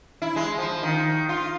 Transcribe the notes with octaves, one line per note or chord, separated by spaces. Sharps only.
E4
G#3
F3
D#3
F4